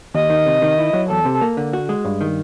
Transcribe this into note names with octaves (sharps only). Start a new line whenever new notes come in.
D#2 D#5
D#3
C3
D#3
E4
F#3
E2 A4
C3
A#3
D3
F#4
G#3
G2
D#3